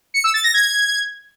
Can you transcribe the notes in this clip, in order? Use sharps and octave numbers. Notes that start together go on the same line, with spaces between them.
C#7
E6
A6
A#6
G#6